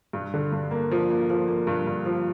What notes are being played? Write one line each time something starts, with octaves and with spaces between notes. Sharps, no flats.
G2
D3
G2
A#3
F3
A#3
F3
A#3
G2
G2
F3